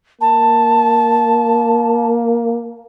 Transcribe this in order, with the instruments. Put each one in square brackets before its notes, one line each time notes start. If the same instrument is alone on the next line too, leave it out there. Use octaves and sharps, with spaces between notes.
[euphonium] A#3 [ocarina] A5